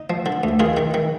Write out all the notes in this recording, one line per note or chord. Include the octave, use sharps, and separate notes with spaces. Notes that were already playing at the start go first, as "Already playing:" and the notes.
Already playing: D#4
F3
D3
D2
D#3 F4 G#4
D#3
D#3